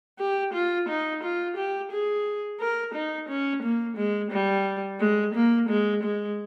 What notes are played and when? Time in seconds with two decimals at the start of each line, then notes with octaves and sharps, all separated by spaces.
0.19 G4
0.53 F4
0.88 D#4
1.23 F4
1.57 G4
1.91 G#4
2.60 A#4
2.94 D#4
3.29 C#4
3.62 A#3
3.97 G#3
4.31 G3
4.99 G#3
5.34 A#3
5.69 G#3
6.03 G#3